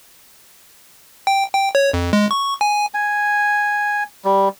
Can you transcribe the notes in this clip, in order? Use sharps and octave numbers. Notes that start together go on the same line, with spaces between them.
G5
G5
C#5
F2
G#3
C#6
G#5
G#5
G3